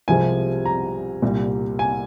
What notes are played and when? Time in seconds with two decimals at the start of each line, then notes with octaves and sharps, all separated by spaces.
0.08 C2 C3 F3 G#3 G#5
0.66 A#5
1.22 C2 A#2 G3
1.79 G#5